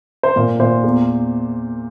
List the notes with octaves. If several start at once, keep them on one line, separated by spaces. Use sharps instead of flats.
C5
A#2 A#4
A#2 C5
E2